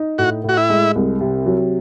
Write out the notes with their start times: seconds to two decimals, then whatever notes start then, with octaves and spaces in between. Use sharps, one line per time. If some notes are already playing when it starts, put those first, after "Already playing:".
Already playing: D#4
0.18 A2 F#4
0.44 A2 F#4
0.57 E4
0.70 G#3
0.96 C2
1.21 C3
1.46 F#3